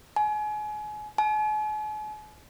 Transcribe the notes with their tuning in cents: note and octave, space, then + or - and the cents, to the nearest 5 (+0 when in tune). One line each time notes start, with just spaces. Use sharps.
G#5 +30
G#5 +45